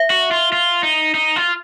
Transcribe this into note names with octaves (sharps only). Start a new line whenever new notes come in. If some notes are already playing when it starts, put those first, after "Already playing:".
Already playing: E5
F#4
F4
F4
D#4
D#4
F4